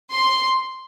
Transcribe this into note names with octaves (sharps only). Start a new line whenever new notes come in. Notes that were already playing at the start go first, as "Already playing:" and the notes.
C6